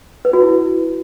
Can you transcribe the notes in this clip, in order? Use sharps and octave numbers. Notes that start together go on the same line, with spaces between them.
B4
F#4
E4